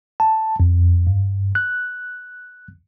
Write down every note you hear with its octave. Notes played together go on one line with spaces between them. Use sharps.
A5
F2
G2
F#6